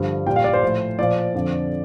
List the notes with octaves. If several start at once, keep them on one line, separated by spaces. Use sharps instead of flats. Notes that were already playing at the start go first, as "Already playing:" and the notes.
Already playing: G2 D3 F3
A#2 G3 G5
F5
D5
C5
A2 F3
A#2 F3 D5
F2 D3 F3